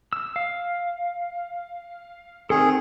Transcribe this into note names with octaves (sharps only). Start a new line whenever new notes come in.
E6
F5
D#3 C4 G#4 A4